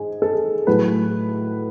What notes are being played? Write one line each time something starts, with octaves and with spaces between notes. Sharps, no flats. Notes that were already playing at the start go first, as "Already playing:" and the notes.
Already playing: G#2 G#4
A4
A2 F#3 A3 B4